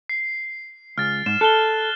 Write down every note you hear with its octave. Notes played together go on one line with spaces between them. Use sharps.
C7
C#2 F6 A6
G#2 E7
A4 F#6 G7